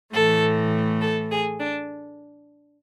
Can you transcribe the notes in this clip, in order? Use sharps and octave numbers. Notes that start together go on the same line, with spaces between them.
A2 E3 A3 A4
A4
G#4
D4